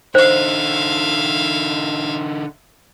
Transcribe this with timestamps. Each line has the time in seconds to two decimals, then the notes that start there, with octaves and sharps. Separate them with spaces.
0.15 D3 D#4 C5 E5 F5